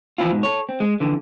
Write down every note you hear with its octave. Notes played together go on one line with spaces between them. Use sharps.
E3 F3 C4 E4 F4
G#2 B2
A4 C#5
C4
G#3
F2 D3 E3